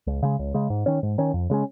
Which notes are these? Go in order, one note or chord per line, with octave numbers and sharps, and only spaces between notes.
C#2
C#3 G#3
C#2
C#3 G#3
G#2
D#3 C#4
G#2
D#3 C#4
F2
C#3 G#3 C#4